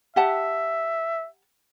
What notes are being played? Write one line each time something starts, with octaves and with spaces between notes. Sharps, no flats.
G4 E5 F#5 A5